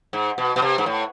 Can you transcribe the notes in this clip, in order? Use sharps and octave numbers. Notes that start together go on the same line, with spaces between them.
G#2
B2
B2
C3
G#2
A2